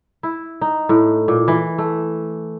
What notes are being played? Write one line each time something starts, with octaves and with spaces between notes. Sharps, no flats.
E4
D#4
A2
A#2
E3
A3